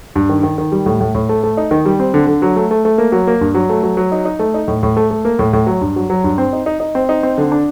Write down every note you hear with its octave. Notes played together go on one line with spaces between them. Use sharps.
G2
D#3
D#3
D#3
G3
A2
A2
A2
A3
A3
D#4
D#3
G3
C4
D3
D3
F#3
A3
A3
A3
A#3
F#3
A#3
G2
F#3
A3
F#3
F#3
D#4
D#4
A3
D#4
A2
A2
A3
A3
A#3
A2
A2
F#3
G2
F#3
F#3
G2
C4
D#4
D#4
D#4
C4
D#4
C4
D3
D4